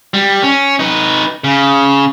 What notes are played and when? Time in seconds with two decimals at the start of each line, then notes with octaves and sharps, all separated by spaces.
0.14 G3
0.42 C#4
0.79 D#4 B4
1.44 C#3